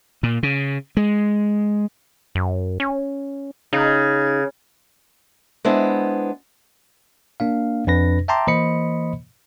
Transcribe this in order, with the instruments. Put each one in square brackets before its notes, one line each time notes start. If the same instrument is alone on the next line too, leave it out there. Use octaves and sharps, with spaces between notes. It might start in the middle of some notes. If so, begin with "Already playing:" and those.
[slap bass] A#2
C#3
G#3
[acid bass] F#2
C#4
[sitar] C#3 [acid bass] D#4
[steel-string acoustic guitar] G#3 B3 D4 E4 C5
[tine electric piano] A#3 D4 F5
F2 D4 B4 A#6
E5 G5 A5 A#5 C6 D6
E3 A#3 C5 D#5 B5 C#7